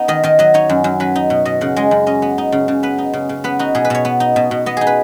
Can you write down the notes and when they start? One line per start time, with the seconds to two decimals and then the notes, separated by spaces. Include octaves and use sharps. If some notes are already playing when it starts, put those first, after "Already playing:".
Already playing: B3 D#4
0.08 D#3 D#5
0.24 D#3 D#5
0.39 F#3 D#5
0.54 D#4 C#5
0.69 F#2
0.84 F#2
1.00 F#3 B4
1.16 D#4
1.30 B2
1.45 B2 D#5
1.61 C#3 F#5
1.76 G#3 D#5
1.91 F#2
2.07 C#4 D#5
2.22 B3
2.38 D#4
2.52 C#3
2.68 C#3
2.83 B3 B4
2.98 D#4
3.14 C#3
3.29 C#3
3.44 B3 B4
3.59 D#4 F#4
3.75 B2 G#4
3.85 B4
3.90 B2 C#5
4.05 B3
4.20 D#4
4.36 B2
4.51 B2
4.66 B3 D#5
4.77 D#4 G#4
4.87 B4